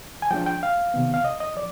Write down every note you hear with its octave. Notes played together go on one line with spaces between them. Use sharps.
G#5
F3 G#3 D4 G5
G5
F5
C3 D#3 B3
F5
D#5
D#5
F3 D5